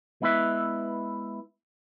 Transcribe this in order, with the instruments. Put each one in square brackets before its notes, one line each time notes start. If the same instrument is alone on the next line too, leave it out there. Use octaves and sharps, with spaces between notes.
[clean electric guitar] G#3 B3 E4 B4 E5